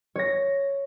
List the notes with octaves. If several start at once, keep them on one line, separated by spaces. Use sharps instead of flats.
C#5 A#6